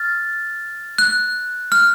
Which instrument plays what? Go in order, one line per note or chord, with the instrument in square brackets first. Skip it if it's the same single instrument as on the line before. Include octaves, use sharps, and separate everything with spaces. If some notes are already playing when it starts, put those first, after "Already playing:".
Already playing: [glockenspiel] F6 A6
F#6
F6